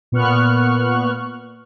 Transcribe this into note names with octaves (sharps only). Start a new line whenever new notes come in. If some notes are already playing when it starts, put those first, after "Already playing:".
A#2 B3 C#6 F6 F#6